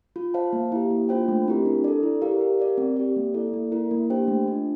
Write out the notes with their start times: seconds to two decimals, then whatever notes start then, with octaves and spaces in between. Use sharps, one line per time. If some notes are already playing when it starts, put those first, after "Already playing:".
0.16 F4
0.34 C5 F5 A5
0.53 A#3
0.72 E4 G4
0.90 A#3
1.09 D4 F4 C5 G5
1.28 A3
1.47 C4 E4 G4 A#4
1.65 D4
1.84 A4 D5
2.03 E4
2.21 G4 A#4 D5 F5
2.41 G4
2.60 A#4 D5
2.78 C4
2.97 G4 D5
3.16 A#3
3.34 E4 A4 D5
3.53 A#3
3.72 E4 A#4
3.91 A#3
4.10 D4 G4 C5 G5
4.28 A3
4.48 D4 F4